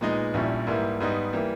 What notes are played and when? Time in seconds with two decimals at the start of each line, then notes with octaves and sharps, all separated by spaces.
0.01 A#2 G#3 B3 D#4
0.34 A#1 A#2 G3 C#4 E4
0.67 G#2 E3 G3 A#3 E4
1.00 G#2 G3 B3 D#4
1.33 E3 G3 A#3